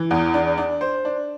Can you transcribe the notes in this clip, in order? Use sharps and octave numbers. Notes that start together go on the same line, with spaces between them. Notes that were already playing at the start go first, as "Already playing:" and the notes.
Already playing: E3
E2
D4
D4
C5
D4